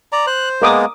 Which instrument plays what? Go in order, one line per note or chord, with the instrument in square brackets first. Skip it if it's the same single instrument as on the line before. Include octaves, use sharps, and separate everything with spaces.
[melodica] D5 A#5
[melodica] C5 [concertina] F#6
[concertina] G#3 A#3 B3 [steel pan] A#4 D6 D#6